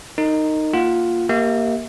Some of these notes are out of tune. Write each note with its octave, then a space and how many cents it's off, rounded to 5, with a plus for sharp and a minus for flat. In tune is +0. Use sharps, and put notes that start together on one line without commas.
D#4 -5 A#4 -35
A#3 +0 F4 +0 F#5 +0
A#3 +0 G4 +0 E5 -30